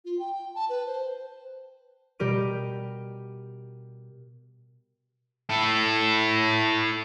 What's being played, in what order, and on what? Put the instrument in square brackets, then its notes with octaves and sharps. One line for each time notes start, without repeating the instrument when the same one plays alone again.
[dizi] F4
G5
A5
B4
C5
[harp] B2 G3 G4 A#4 D#7
[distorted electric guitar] E4 A4